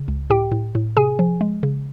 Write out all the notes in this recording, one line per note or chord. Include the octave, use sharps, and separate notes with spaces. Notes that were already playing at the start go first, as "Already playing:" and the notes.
Already playing: C#3
C#2
A2 G4 G5
A2
A2
C3 G#4 G#5
F3
G#3
C#3